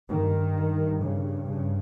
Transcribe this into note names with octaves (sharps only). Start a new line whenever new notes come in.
G2 D#3
C#3
C#3